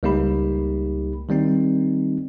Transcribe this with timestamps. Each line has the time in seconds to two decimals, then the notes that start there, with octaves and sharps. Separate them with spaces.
0.03 C#2 G3 A#3 D#4 G4 B5
1.29 D#3 G3 A#3 C4 D#4